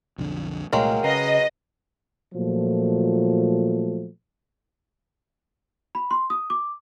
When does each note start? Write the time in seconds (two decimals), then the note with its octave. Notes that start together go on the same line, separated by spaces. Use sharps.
0.18 B1 F2 D3
0.73 C2 A#2 F#3 G#3 A3 A#4 F5 G5
1.04 C#3 B4 D#5 A#5 C7
2.34 A#2 F3 F#3 A3
5.95 B5
6.11 C6
6.30 D#6
6.50 D6